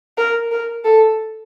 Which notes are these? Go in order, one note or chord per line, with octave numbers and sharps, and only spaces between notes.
A#4
A#4
A4